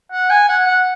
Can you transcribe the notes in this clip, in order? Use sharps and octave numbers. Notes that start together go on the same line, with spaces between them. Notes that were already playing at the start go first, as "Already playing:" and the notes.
F#5
G#5
F#5
F#5